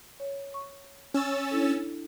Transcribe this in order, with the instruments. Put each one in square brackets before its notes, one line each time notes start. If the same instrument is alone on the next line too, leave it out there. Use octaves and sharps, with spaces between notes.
[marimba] C#5
C#6
[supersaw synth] C#4 E6 A6
[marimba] D4 E4 A4